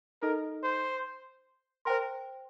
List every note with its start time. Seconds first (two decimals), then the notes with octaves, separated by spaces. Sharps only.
0.22 D#4 A4 A#4 D#5
0.63 C5
1.85 A#4 C5 G5 C6